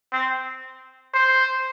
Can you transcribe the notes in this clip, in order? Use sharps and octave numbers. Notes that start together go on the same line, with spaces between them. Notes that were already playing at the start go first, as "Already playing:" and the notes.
C4
C5